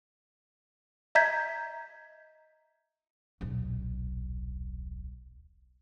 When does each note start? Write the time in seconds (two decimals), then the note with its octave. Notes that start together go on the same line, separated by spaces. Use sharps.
1.15 D#5 E5 A#5 G6 G#6 B6
3.41 D#1 B1